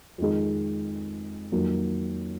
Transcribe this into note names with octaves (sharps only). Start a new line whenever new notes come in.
F2 D#3 G#3
F2 D#3 F#3 A#3